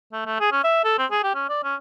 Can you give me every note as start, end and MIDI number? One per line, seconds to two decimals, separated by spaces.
0.13 0.23 57
0.26 0.39 57
0.40 0.51 68
0.52 0.61 61
0.64 0.81 76
0.84 0.98 69
0.98 1.06 60
1.11 1.22 68
1.24 1.35 67
1.35 1.48 61
1.49 1.62 74
1.64 1.75 61